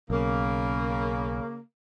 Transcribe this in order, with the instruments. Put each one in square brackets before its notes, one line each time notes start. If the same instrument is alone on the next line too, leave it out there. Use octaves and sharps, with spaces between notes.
[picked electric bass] B1 [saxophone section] C#3 A#3